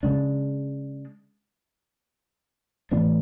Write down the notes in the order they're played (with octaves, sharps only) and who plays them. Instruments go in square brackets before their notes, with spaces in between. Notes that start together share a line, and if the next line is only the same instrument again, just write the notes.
[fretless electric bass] C#3 G#3 D4
A2 E3 B3 D4